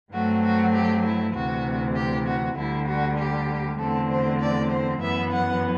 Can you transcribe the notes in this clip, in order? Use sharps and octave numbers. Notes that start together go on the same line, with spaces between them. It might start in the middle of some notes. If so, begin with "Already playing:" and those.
G2 F#3 A3 C4 F#4
F#4
G4
E4
D2 C3 E3 F#4
G4
F#4
D2 D3 G3 E4
F#4
G4
E2 D3 A3 C4 A4
C5
D5
C5
F#2 E3 B3 E5
F#5